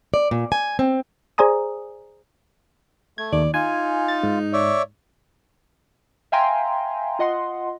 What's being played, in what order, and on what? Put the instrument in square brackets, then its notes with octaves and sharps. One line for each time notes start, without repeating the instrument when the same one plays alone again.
[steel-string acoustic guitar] D5
A#2
G#5
C4
[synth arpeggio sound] G#4 C5 D5 G#5 A#5 D#6
[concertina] A3 [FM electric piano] G#6
[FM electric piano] D#2 [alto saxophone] D5
[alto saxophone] D#4 [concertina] F4 [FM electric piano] G#5
[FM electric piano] A6
G#2
[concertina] C#5 D5 E5
[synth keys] E5 F5 G5 G#5 A#5 C6
F4 D#5 F#5 C6